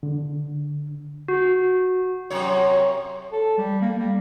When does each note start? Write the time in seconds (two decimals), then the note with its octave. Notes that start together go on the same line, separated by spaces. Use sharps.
0.03 D3
1.28 F#4
2.30 F#2 C3 C#5
3.32 A4
3.58 G3
3.81 A#3
3.99 G3